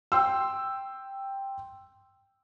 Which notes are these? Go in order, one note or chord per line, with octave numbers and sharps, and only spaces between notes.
G5 C6 E6